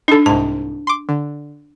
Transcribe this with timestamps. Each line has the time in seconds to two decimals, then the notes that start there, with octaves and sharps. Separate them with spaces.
0.08 D4 D#4 A4
0.26 C2 G#2 A5
0.87 C6 D6
1.09 D3